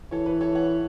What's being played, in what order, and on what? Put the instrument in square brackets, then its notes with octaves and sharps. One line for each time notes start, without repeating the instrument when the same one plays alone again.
[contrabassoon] E3 [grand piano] A4 C#5
[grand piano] B4
A4 C#5
C#5 F#5